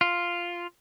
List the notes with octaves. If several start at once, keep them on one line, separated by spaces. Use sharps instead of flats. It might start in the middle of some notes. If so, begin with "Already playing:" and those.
F4